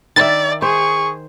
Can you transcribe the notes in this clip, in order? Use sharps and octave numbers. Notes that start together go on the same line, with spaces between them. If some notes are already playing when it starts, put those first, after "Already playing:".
D#3 D5 E5 A6
G#4 C5 C#6